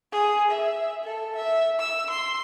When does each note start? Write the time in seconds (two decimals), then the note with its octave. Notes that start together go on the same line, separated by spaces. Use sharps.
0.12 G#4
0.51 E5
1.04 A4
1.36 E5
1.79 E6
2.10 C6